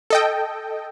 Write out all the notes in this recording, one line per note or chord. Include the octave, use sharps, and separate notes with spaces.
A4 D#5 G5